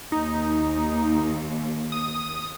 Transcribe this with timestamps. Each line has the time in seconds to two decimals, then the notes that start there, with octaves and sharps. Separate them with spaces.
0.12 D#2 D#4
1.92 D#6